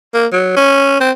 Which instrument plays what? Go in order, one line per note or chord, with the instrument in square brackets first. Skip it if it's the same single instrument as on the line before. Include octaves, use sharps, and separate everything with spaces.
[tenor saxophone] A#3
F#3
C#4
C4